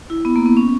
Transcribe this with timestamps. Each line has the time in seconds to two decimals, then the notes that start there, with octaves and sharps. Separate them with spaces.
0.10 E4
0.25 B3
0.36 A#3
0.46 B3
0.57 C#4